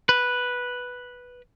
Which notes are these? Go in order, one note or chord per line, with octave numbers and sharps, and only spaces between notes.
B4